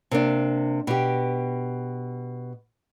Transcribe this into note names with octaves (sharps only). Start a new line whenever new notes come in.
C3 A#3 D4
B2 G4